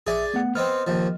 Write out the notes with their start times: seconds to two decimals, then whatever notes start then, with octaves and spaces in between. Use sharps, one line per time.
0.07 A#1 G#4 D5 E5
0.34 A3 B3 F#5
0.55 B3 C4 D#5 F6
0.87 D#2 F3